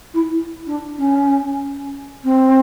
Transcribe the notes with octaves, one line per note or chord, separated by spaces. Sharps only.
E4
D4
C#4
C4